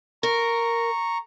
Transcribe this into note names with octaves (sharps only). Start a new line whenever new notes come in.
A#4 A#5 C#6